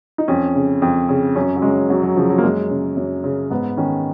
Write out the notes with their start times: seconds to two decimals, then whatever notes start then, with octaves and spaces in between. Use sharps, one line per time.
0.18 D#4
0.28 F2 C#4
0.55 C#3
0.82 F2
1.09 C#3
1.36 F#2 C#4
1.56 F#3
1.62 C#3 G#3
1.89 F#2 F#3
2.03 F#3
2.17 C#3 F3
2.30 F#3
2.38 A#3
2.43 F#2 G#3
2.71 C#3
2.97 F#2
3.24 C#3
3.50 G#2 B3
3.77 D#3 C#4